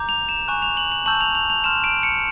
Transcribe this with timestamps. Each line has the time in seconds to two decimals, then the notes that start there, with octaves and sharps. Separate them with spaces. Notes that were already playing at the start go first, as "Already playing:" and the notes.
Already playing: A#5 D6 G6
0.09 F7
0.29 E7
0.48 G#5 C#6 F#6
0.62 F7
0.77 F#7
0.92 F#7
1.06 A5 C#6 E6 G6 F#7
1.21 F7
1.35 F7
1.50 F7
1.64 C6 F6 E7
1.84 D7
2.03 C#7